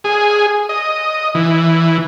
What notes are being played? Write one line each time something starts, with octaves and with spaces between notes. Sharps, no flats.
G#4
D#5
E3